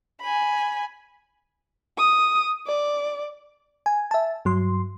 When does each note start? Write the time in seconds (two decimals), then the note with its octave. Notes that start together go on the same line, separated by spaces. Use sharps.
0.21 G#5 B5
1.98 D#6
2.67 D5
3.86 G#5
4.11 E5 A5
4.45 G2 F#3 C6